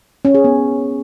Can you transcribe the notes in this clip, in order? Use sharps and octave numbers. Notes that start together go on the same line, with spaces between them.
C#4
G#4
B3